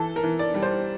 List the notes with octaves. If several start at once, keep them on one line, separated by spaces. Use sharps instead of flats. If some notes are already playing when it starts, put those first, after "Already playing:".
Already playing: E3 A4
A#4
E3
D5
G3
C5